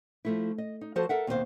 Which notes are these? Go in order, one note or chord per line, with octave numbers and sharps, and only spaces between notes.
F3 A3 E4
D#5
D#4
F3 F#4 A4 C5 A5
A4 A#4 E5 F#5
D#2 B2 C4 F4 C5 F5